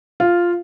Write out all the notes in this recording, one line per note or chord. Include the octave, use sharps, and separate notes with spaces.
F4